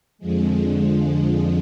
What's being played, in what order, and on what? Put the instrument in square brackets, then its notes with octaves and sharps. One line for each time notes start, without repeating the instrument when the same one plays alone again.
[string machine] F2 D3 F3 G#3